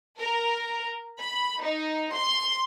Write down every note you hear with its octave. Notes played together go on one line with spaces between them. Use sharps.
A#4
B5
D#4
C6